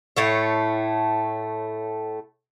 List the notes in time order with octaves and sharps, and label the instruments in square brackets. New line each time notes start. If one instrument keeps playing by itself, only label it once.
[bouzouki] A2 A3 C#5